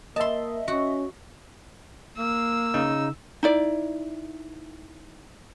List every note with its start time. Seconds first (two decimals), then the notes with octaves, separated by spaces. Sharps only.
0.16 A#3 D#5 E5 A5 C6
0.68 C#4 F#4
2.18 A#3 E6
2.74 C#3 D#4
3.43 D#4 E4 D5